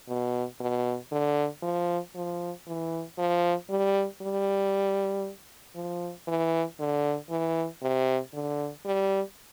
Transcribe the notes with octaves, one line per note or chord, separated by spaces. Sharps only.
B2
B2
D3
F3
F3
E3
F3
G3
G3
F3
E3
D3
E3
C3
D3
G3